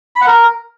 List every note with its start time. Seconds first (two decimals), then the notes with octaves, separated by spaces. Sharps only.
0.16 B5
0.21 F#5
0.27 A#4